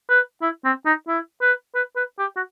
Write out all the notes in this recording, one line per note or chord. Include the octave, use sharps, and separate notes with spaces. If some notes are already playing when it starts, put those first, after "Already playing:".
B4
E4
C4
D#4
E4
B4
B4
B4
G4
F#4